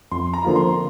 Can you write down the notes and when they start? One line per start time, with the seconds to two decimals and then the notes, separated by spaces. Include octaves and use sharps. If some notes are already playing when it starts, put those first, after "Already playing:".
0.12 F2 C6
0.34 A#5
0.45 D3 F3 A#3 F4
0.56 C6